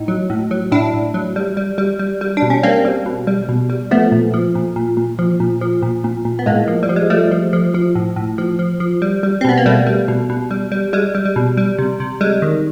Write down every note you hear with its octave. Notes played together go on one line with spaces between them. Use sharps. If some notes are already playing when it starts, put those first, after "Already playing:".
Already playing: A2 D#4
F#3
A2
F#3
A2 D4 E4
A2
F#3
G3
G3
G3
G3
G3
D4
B2
C#4
G3 A#3 C4
G3
B2
G3
B2
G3
F3 A3 B3
A#2
F3
A#2
A#2
A#2
F3
A#2
F3
A#2
A#2
A#2
B3
A2 G#3 A#3
F3
G3
F3
G#3
F3 G3 A3
F3
F3
F3
A2
A2
F3
F3
F3
G3
G3
C4
B2 B3
A#3
B2 G3 A3
G3
B2
B2
G3
G3
G3 G#3
G3
G3
B2
G3
C3
C3
G3 G#3
D#3